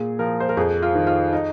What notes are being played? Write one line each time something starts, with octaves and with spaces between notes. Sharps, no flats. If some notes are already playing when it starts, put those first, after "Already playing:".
Already playing: A#2 G#4
F3 A#4
C5
A#4
F2 G#4
F4
D#3
F4
D#4